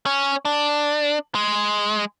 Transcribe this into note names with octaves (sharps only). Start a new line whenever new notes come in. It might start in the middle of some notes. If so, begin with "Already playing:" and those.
C#4
D4
G#3